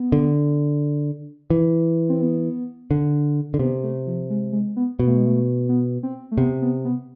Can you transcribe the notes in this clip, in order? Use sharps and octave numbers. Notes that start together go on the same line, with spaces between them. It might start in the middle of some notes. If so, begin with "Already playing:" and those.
Already playing: B3
D3
E3
C4
B3
D3
D3
C3 B3
A3
F3
G#3
G#3
B3
B2 B3
A3
G#3
A3
B3
C4
A3
C3 B3
B3
B3